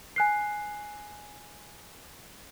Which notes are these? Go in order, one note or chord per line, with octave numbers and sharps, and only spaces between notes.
G#5 F#6 C7